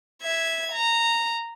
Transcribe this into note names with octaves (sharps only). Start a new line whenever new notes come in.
E5 G#6
A#5